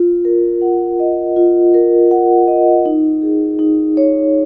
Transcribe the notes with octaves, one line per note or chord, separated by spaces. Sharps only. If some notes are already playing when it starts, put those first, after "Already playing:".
Already playing: F4
A#4
F#5
D#5
F4
A#4
F#5
D#5
D#4
G#4
D#4
C#5